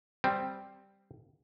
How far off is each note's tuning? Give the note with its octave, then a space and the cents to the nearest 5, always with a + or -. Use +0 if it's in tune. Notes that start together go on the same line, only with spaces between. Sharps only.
G3 +0 C4 +0